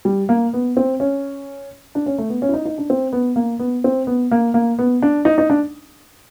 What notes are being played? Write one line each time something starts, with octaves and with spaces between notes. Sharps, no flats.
G3
A#3
B3
C4
C#4
D4
C#4
A3
B3
C#4
E4
D#4
D#4
D4
C4
B3
A#3
B3
C4
B3
A#3
A#3
B3
D4
D#4
D#4
D4